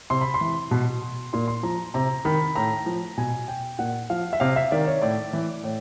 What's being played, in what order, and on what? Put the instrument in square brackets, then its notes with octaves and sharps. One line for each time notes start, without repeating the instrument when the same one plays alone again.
[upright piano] C3 C6
B5
C6
E3
B2
A#2 C6
C6
F3 A#5
C3 A#5
D#3 B5
A2 A#5
F3
B2 G#5
G5
A#2 F#5
F3 F5
E5
C3 F5
E5
D#3 D5
C#5
A2 D5
E3
A2